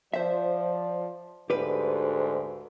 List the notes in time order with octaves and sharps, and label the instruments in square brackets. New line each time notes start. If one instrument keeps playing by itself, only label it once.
[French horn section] F3 D5 [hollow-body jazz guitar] C5 E5
[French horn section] D2 G#2 [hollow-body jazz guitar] G4 B4